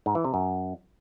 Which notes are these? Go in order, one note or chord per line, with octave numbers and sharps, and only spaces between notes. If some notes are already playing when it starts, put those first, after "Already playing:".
G#2
E3
C3
F#2